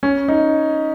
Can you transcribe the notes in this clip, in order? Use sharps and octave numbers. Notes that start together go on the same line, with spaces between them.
C#4
D#4